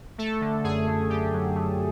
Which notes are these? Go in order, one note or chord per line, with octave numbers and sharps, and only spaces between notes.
A3 A4
D3
F#2 G#4
A3
D3 G4
F#3
A3